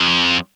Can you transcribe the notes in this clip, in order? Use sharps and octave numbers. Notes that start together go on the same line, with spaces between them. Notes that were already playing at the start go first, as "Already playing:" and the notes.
Already playing: F2